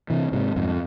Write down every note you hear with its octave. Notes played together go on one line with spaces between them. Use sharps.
C3 E3
G#2 C3
F2 G#2